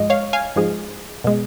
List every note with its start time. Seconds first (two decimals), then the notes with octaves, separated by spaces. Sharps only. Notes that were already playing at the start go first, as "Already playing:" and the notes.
Already playing: G#2 F3 G#3 D#5
0.10 C#5 F5
0.33 F5 G#5
0.56 G#2 F3 G#3
1.24 B2 G#3